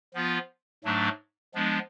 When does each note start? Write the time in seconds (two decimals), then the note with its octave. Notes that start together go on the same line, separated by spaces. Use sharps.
0.14 F3 B3 F4
0.84 G#2 F#3 A3 D4
1.54 F3 G#3 B3 D4